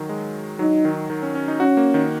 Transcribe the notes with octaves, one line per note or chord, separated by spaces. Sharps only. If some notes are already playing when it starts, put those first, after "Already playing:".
Already playing: D#3 F#3
G#3
F#3 D#4
D#3
D#3
C#4
C#4
D#4
C#4 F#4
A#3
D#3